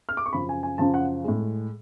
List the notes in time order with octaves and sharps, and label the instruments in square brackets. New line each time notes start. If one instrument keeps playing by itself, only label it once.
[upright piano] F6
D6
C#6
F#2 C#3 F3 B5
G#5
G#5
F#2 C#3 F3 A5
F#5
A2 G#3